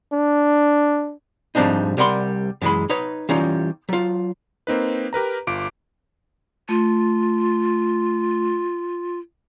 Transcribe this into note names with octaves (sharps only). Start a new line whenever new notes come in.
D4
G#2 F3 G3 C4 D4 D#4
C2 G3 A#4 F#5 B5 C6
F#2 E3 G#3 B5
D#4 B4 C#5
E3 G3 C#4 D#4 F4
F#3 F4
A#3 C4 D#4 B4
G4 A#4 B4 A#5
G1 F4 D6 D7
A3 F4